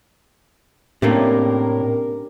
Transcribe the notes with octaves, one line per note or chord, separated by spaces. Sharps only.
A2 C3 A3 A#3 C#4 D4 G4 A#4